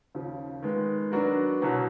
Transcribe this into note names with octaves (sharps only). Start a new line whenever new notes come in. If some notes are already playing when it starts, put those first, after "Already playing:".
D#2 C#3 F3
D#3 G#3 B3
F#3 B3 D4 F#4 A#4
C2 B2 F#3